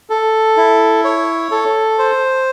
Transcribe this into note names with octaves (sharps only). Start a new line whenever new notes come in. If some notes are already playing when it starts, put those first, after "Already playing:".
A4
E4
C#5
A4
C5